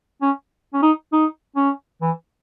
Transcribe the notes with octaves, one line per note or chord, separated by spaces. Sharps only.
C#4
C#4
D#4
D#4
C#4
E3